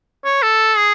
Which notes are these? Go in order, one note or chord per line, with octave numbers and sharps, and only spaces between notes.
C#5
A4
G#4